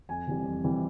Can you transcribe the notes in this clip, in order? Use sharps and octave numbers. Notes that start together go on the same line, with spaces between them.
F2 G#5
C3 E3 G3
F2
C3 E3 G3